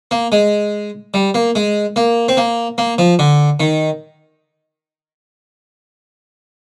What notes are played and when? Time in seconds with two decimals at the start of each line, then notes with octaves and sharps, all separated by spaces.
0.11 A#3
0.32 G#3
1.14 G3
1.34 A#3
1.55 G#3
1.96 A#3
2.29 C4
2.37 A#3
2.78 A#3
2.98 F3
3.19 D3
3.60 D#3